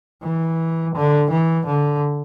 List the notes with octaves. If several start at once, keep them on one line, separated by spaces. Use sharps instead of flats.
E3
D3
E3
D3